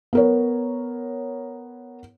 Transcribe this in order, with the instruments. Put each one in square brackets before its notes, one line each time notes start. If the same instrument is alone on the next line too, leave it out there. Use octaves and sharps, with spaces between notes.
[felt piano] B3 A#4 C#5